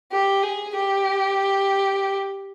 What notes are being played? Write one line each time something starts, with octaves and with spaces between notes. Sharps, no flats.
G4
G#4
G4